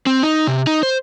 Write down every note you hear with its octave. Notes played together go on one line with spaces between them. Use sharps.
C4
D#4
C3
D#4
C5